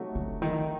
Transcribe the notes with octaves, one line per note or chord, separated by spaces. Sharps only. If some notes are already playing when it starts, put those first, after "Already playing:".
Already playing: C3 F#3 A3 D#4 F#4
D3
D#3